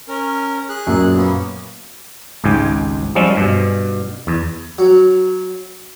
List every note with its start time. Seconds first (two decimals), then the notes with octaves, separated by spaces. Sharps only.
0.09 C#4 A#4
0.69 G#4 F#6
0.87 F#2 A#2
1.16 A#3 B3 C#4
2.44 G#1 C#2 G#2 G4 G#5
3.15 F3 G3 G#3 C4 C#4 F4
3.37 G2 B2
4.27 E2
4.78 F#3